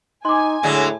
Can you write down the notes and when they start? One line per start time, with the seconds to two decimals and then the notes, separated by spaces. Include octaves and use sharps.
0.25 D#4 G#5 C6 D6
0.63 A2 D3 F#3 G#3